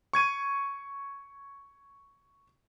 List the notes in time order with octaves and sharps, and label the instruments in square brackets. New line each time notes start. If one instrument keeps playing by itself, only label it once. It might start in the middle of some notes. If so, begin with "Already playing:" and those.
[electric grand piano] C#6 G#6 D#7